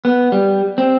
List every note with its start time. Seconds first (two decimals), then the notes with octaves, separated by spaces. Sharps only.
0.05 B3
0.32 G3
0.78 C4